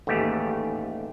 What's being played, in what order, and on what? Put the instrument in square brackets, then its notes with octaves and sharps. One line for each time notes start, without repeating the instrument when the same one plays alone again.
[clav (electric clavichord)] A1 D#2 G#2 A3 G4